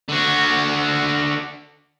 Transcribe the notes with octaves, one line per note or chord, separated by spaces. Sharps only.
D3 F#4